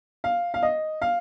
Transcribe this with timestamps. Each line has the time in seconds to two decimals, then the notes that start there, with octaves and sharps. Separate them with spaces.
0.24 F5
0.54 F5
0.63 D#5
1.02 F5